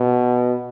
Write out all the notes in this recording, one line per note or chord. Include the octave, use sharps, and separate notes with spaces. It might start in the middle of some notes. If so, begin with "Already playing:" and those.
Already playing: B2